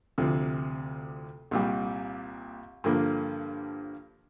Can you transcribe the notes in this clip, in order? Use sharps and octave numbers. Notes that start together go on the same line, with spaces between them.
D2 C3 F3
C2 A#2 G3
G2 D3 F3 A#3